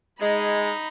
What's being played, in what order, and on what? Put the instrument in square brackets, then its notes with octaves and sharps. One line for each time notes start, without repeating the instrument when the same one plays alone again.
[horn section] G#3 [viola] D#4 B5 [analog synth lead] D#5